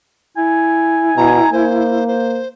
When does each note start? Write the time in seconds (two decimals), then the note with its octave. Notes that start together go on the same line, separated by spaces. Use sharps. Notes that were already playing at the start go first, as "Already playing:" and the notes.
0.37 E4 G#5
1.17 B2 A#5
1.53 A#3 C5
2.08 C5